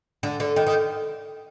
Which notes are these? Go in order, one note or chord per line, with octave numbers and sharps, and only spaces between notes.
D3
D3
D#3
D#3